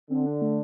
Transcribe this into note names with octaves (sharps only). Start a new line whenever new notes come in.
D3 C4
D4
A3